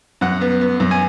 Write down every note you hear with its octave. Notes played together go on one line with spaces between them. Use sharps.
F#2 F#5
B3
B3
F#2
G#5